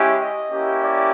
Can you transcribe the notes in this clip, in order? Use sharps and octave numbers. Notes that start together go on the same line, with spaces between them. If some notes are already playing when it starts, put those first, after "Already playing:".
Already playing: G#3 C#4 E4 G4
D#5
A#3 C#4 E4 G4
D5